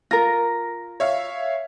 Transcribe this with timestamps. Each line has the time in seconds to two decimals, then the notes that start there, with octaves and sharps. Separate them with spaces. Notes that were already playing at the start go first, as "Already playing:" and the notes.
0.11 F4 A#4 A#6
1.00 C#5 E5 F5